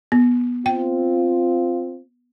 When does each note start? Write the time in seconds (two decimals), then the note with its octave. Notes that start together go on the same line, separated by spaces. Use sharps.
0.12 B3
0.66 C4 F4 G5